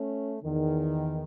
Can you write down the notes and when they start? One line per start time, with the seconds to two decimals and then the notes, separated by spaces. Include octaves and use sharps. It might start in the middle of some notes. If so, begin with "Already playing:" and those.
Already playing: A3 C#4
0.42 E2 D#3